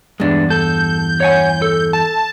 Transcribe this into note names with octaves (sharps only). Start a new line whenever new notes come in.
E2 G2 G#3 D4
A4 G6
C#5 F#5 G#5
A4
A5